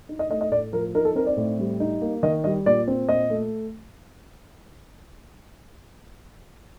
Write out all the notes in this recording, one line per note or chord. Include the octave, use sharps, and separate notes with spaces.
D#4
D#5
A3 D#5
D#5
A2 D5
F3 A#4
D#4 A#4
A4
C4 A#4
D5
A2
G3
D#4
A#3
D#3 D#5
G3 D#5
A#2 D5
C4
A#2 D#5
A3